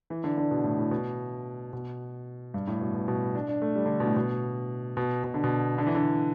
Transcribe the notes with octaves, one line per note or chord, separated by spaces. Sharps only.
E3
D3
D3
B2
A2
A2
B2
B2
G2
A2
B2
B2
B2
D4
D4
A3
G3
D3
B2
A2
B2
B2
B2
D3
B2
D3
E3
D3